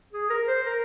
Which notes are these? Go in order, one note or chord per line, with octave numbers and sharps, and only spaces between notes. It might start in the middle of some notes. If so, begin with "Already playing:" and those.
G#4
A#4
C5
A#4